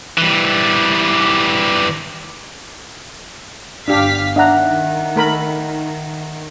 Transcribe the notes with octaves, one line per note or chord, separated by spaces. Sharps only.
E3 G3
G1 D4 G4 F5 B6
D#3 D4 E5 F#5 A#5 F#6
A3 A#4 B5